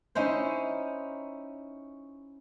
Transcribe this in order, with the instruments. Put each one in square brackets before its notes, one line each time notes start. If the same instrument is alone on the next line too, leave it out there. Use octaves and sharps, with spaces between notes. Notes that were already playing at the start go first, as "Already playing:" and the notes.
[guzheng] C#4 D#4 E4 C5